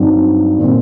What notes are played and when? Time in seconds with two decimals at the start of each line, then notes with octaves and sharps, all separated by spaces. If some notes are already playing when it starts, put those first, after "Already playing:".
Already playing: G2 F#3 C4 D#4
0.58 A#2 G3 C4